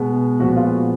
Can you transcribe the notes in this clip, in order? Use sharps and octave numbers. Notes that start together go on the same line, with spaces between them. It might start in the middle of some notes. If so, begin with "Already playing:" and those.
Already playing: B2 G#3 B3
A#2 F3 G#3 B3 F#4
F4
F#4